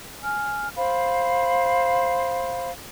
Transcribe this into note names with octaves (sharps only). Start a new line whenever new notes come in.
G#5 F6
C5 F5 B5